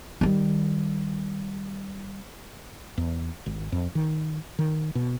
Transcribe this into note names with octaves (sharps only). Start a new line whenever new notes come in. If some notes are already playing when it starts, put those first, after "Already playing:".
D#3 G3
E2
G#1
F2
D#3
D#3
B2